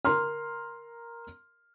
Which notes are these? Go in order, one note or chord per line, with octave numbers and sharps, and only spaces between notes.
A#4 A#5 C6 F6